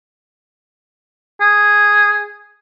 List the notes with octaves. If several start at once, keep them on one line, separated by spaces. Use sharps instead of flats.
G#4